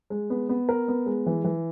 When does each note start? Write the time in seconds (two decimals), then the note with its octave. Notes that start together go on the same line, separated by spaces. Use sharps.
0.10 G#3
0.30 B3
0.49 B3
0.69 A#4
0.88 B3
1.06 G#3
1.26 E3
1.44 E3